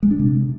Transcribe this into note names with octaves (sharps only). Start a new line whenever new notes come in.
G#3
D4
C3